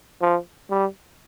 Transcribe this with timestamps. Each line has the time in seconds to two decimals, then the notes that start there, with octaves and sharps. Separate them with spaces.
0.22 F3
0.70 G3